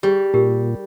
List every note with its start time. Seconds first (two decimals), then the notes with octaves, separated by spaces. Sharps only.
0.03 G3 G4 G#4
0.34 A#2 D#4 G4 A#4